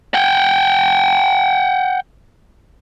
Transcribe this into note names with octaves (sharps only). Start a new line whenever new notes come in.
F#5 G5